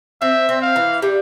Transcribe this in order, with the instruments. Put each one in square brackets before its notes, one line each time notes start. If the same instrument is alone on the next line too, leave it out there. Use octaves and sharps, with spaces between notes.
[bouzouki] C4 [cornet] E5
[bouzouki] C4
[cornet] F5
[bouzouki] E3
G3